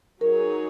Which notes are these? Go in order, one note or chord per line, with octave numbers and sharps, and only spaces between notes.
F#3 D#4 G#4 A#4 C#5